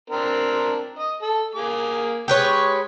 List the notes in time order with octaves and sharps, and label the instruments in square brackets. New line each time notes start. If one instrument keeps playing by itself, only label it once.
[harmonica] C4 D4 A#4
D#5
A4
A#3 G#4 D6
[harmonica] G#3 [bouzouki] G4 B4 C#5